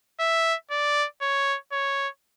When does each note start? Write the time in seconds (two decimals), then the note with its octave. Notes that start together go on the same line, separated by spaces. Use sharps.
0.20 E5
0.71 D5
1.22 C#5
1.72 C#5